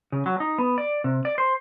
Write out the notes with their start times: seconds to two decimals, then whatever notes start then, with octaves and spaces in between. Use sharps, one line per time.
0.12 C#3
0.26 F#3
0.40 D#4
0.58 B3
0.78 D5
1.04 C3
1.25 D5
1.38 C5